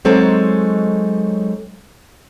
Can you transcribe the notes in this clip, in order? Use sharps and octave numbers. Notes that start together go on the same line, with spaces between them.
F#3 G#3 C4 D#4 A4 C#5